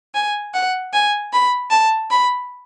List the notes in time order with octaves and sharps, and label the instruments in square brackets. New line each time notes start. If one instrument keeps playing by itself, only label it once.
[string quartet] G#5
F#5
G#5
B5
A5
B5